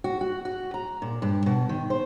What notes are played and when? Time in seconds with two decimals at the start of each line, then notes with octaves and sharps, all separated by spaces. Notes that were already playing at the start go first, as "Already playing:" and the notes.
0.04 F#4
0.21 F#4
0.45 F#4
0.74 A#5
1.02 A#2
1.22 G2
1.46 B2
1.69 D#3
1.90 C5